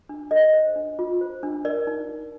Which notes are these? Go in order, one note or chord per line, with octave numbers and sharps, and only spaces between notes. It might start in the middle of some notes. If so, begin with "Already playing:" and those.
D4
A4 D#5
C5
D4
F4
C5
D4
A#4 D5
D#4
D#4